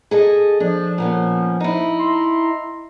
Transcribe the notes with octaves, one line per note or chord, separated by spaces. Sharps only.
G#4 A4 D#5
F3 D4
A#2 B3 C#4
D#4 E4
E5 A#5 C6